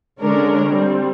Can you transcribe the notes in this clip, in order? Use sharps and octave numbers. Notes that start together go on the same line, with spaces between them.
D3 G#3 C#4 D4 A#4
G3 C4